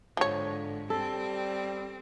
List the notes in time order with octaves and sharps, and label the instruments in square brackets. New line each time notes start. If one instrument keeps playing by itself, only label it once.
[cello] G#2 [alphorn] D3 [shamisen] F3 C#5
[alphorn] G3 [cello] C4 [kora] A4